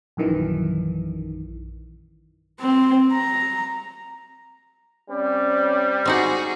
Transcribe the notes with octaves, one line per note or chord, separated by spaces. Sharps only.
A#1 F#2 D#3 E3
C4
A#5
G3 C4 C#4 D5
C4 D#4 F#4 G#4 F#5